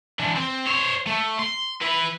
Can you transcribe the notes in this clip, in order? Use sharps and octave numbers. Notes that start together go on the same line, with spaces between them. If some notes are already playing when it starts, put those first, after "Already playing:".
E3 D4
C4
C5 C#5
A3
C6
E4 B4